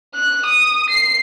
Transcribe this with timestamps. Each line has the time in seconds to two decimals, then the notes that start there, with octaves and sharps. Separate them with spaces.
0.15 F#6
0.46 D#6
0.89 C7